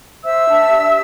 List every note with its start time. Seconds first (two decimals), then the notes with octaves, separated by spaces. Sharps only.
0.24 C5 E5 E6
0.47 D4
0.70 G4